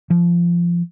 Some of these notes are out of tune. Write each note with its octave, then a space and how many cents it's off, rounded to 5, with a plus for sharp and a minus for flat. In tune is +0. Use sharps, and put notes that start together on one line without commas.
F3 -20